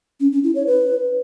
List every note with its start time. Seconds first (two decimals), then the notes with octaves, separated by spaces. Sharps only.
0.20 C#4
0.32 C#4
0.44 E4
0.55 C#5
0.67 B4